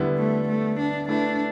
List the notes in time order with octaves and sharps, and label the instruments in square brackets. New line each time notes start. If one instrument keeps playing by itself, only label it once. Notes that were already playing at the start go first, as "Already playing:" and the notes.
Already playing: [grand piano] D3 G3 B3 E4
[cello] A3
A3
D4
[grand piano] A3 E4 B4 E5 [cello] D4